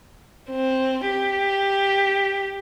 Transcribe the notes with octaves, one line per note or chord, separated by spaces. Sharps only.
C4
G4